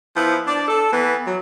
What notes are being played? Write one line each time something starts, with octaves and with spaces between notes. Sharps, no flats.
F3 B3 E4
D4 D5
A4
E3 B3
F#3